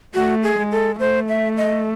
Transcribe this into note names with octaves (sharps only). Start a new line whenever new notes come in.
A3 F#4
G#4
G#3
A4
A3 C5
E5
D#5